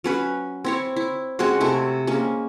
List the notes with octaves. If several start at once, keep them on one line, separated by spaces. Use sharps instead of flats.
F#3 C#4 B4
C4 E4 C#5
E4
G#3 C4 C#4 F#4
C3 A3 E4
G#3 A#3 C#4